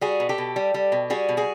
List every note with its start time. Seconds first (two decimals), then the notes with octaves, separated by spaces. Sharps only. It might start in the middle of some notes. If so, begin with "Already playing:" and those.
0.01 G3 F#4 G#4
0.20 B2
0.29 G4 A4
0.38 B2
0.56 G3
0.74 G3
0.92 B2
1.10 G3 F#4 G#4
1.29 B2
1.37 F#4 G#4